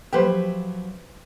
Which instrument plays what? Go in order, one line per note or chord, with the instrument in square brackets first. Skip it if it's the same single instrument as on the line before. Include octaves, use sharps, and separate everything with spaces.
[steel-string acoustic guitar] F3 F#3 E5 [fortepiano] G4 B4 C5